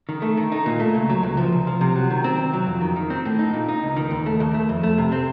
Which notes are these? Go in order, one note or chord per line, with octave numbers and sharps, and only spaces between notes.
D#3
A3
D#3
D#4
A#2
A3
C#2
F#3
C#2
F3
C2
F3
C3
F#3
D#3
C4
C2
F#3
F2
D#3
D#3
C4
A2
D#4
A#2
D#4
C#2
D#3
D#2
A3
D#2
A3
F2
A3
C3
C4